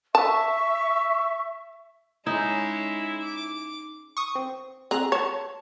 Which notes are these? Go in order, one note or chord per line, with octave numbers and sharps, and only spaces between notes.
E5 A5 C#6
G#3 C#4 D#4 E4
D6
C#6 D#6
C4
C4 G#4 A#5 F#6
C#5 A5